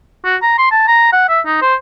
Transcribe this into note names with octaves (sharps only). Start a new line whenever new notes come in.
F#4
A#5
C6
A5
A#5
F#5
E5
D#4
C5